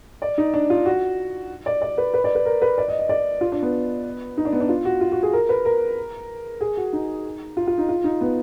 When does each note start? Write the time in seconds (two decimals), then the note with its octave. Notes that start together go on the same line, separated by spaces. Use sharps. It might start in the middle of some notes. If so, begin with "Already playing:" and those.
0.22 D5
0.38 D#4
0.54 D4
0.70 F4
0.86 F#4
1.66 D5
1.82 D5
1.98 B4
2.14 B4
2.24 D5
2.35 B4
2.45 A#4
2.62 B4
2.78 D5
2.88 D#5
2.99 D#5
3.09 D5
3.41 F4
3.52 D4
3.63 B3
4.37 D#4
4.45 D4
4.53 B3
4.60 D4
4.69 F4
4.85 F#4
5.01 F4
5.12 F#4
5.23 G#4
5.33 A#4
5.49 B4
5.65 A#4
6.61 G#4
6.77 F#4
6.93 D#4
7.57 F4
7.67 F4
7.78 D#4
7.89 F4
8.04 D#4
8.21 B3